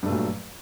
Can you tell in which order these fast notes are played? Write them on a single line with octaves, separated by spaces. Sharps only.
G2 A3 A#2 F#3